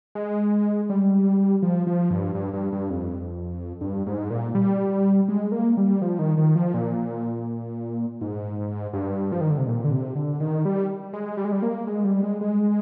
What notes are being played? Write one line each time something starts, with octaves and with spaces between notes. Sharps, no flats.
G#3
G3
F3
F3
G2
G2
G2
G2
F2
G2
G#2
A#2
G3
G#3
A#3
G3
F3
D#3
D#3
F3
A#2
G#2
G2
F3
D#3
D3
C3
A#2
D3
C3
D3
D#3
G3
G#3
G3
G#3
G3
A#3
G#3
G3
G#3
G#3